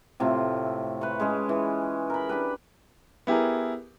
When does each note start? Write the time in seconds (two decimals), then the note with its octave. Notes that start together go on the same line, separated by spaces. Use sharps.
0.20 A2 C3 A3 F4
1.01 B4 C#5
1.20 G#3 C#4 G#4
1.49 E3
2.10 A#4 B5
2.29 D4 G4 B4
3.27 B3 E4 G4 G#4 A#4